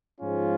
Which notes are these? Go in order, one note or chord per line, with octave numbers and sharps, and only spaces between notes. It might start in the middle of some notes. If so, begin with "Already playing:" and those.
G#2 F3 G#3 C#4 F4